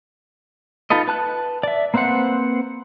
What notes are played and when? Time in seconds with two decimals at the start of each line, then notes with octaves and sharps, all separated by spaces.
0.90 D#4 F4 A4 B4 D#5
1.08 B4 A5 F#6
1.63 D5 E5
1.94 A#3 C4 B4 C5 F#5